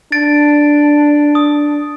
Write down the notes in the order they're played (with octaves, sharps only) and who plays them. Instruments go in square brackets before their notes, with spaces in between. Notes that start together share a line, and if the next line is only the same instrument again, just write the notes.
[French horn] D4 [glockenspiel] A6 D7
[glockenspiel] D#6